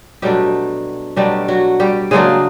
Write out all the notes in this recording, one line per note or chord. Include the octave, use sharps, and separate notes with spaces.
B2 F#3 G3 A3 D4 G4
B2 F#3 G3 A3 D4 G4
F#3 F#4
G3 G4
C#3 F#3 G#3 A#3 D4 G#4